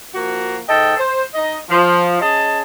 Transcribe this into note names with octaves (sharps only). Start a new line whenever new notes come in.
F3 A#3 F#4
G#2 A4 D#5 G5
C5
D#4 D#5
F3
C#4 G#4 D#5 A5